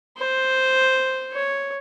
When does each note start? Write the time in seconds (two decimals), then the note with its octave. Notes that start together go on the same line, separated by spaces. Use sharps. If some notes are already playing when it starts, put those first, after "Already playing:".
0.18 C5
1.32 C#5